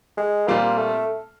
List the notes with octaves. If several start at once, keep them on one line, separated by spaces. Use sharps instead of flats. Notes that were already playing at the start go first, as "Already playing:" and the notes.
G#3
A#2 G3 A#3 C4 F4
A3